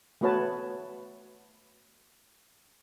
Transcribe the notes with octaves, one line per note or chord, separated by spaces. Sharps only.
A3 B3 F#4 B4 C#5 A5